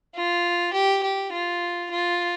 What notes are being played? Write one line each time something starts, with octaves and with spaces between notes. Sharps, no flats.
F4
G4
G4
F4
F4